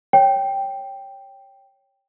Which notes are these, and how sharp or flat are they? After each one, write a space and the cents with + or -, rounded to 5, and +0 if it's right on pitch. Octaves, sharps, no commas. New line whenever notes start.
C#5 +0 G5 +0